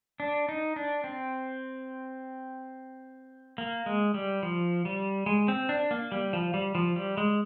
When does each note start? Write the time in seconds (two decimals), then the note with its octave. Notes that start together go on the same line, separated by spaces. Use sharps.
0.20 D4
0.49 D#4
0.76 D4
1.04 C4
3.58 A#3
3.86 G#3
4.14 G3
4.43 F3
4.85 G3
5.26 G#3
5.48 C4
5.69 D4
5.91 A#3
6.12 G3
6.33 F3
6.54 G3
6.75 F3
6.96 G3
7.17 G#3